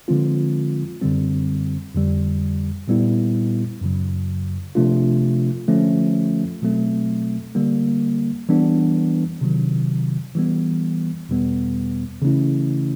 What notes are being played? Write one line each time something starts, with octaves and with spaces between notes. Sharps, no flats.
D3 F3 G#3 C4 F4
F#2 D3 G3 C4
F2 D3 G3
A#2 G3 B3 E4
F#2 C#3 F#3
C3 F3 A3 D4 F4
D3 F3 A3 C#4 F4
B2 F#3 A3 C4
D3 G3 A#3
E3 G3 B3 D4
C3 D#3 F#3
E3 G3 B3
E2 B2 G3 B3
C#3 E3 A3 C#4 E4